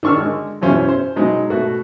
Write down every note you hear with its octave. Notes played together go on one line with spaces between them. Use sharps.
D#3 D4 C#6 E6 F6
D3 G#3
F#2 B2 E3 C#4 F4 C5
C5
B2 F#3 G#3 D#4
B2 A3 F#4